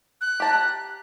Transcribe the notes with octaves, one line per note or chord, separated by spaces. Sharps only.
F#6
G4 A5 A#5